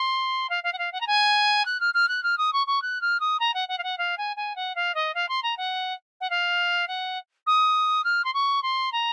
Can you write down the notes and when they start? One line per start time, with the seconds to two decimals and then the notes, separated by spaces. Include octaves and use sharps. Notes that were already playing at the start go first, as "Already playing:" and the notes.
Already playing: C6
0.50 F5
0.64 F5
0.73 F#5
0.78 F5
0.92 F#5
1.01 A#5
1.07 G#5
1.65 F#6
1.80 F6
1.94 F6
2.08 F#6
2.23 F6
2.38 D#6
2.53 C#6
2.67 C#6
2.82 F#6
3.01 F6
3.20 D#6
3.40 A#5
3.54 F#5
3.69 F#5
3.78 F5
3.83 F#5
3.98 F5
4.18 G#5
4.37 G#5
4.56 F#5
4.75 F5
4.95 D#5
5.14 F5
5.29 C6
5.43 A#5
5.57 F#5
6.21 F#5
6.30 F5
6.88 F#5
7.47 D#6
8.04 F6
8.25 C6
8.34 C#6
8.63 C6
8.92 A#5